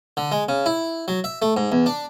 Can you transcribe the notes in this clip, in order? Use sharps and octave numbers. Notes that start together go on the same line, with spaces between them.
D3
G#3
C#3
E4
F#3
E5
A3
G#2
E2
D4